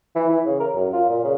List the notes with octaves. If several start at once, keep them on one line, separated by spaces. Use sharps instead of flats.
E3
E3
C#3
A#4
F#2
F4
A#2
C#3